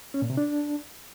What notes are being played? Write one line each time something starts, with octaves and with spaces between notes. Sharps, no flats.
C#4
A#2
C3
D4